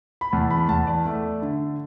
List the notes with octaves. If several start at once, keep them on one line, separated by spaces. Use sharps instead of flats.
B5
E2 A5
B5
E2 A5
D5
A3
D3